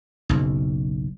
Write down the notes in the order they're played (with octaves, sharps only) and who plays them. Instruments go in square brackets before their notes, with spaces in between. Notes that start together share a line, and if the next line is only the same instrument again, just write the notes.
[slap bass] F#1 B1